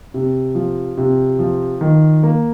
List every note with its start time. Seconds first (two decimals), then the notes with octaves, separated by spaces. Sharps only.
0.14 C3
0.55 F3
0.98 C3
1.39 F3
1.81 D#3
2.23 A#3